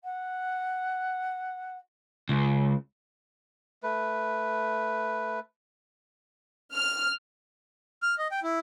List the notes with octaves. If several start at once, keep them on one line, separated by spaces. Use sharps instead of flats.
F#5
C#2
A3 B4
F6
F6
D#5
G5
E4